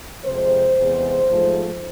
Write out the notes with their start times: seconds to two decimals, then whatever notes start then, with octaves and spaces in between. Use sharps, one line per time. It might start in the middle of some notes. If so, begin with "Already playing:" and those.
0.26 F2 C3 G#3 C5
0.77 E2 C3 G#3
1.30 G#2 F3 A3